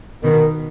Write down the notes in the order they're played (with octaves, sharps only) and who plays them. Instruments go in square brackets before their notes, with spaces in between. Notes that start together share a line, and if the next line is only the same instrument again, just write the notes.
[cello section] B2 D#3 [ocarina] A#4